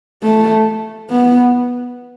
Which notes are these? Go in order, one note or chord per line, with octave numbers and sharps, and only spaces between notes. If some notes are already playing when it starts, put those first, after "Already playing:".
A3
B3